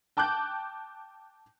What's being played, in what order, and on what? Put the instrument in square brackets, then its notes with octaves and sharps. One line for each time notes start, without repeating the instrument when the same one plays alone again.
[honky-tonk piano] G5 A5 D6 F#6 G6